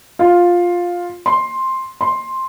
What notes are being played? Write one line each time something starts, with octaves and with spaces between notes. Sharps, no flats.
F4
C6
C6